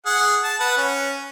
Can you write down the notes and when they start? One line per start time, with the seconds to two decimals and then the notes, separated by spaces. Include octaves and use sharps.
0.06 G#4 F#5
0.44 A5
0.60 B4 F#5
0.77 C#4